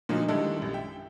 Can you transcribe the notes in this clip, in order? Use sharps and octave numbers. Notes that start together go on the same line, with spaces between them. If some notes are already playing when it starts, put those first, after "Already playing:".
A#2 D3 F3 F#3 D#4 F4
D#3 G3 G#3 D4 E4 A4
A#1 F#2 G3
E5 G5